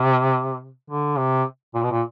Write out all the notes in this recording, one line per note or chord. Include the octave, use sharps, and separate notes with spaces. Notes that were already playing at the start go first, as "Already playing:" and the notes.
Already playing: C3
D3
C3
A#2
B2
A#2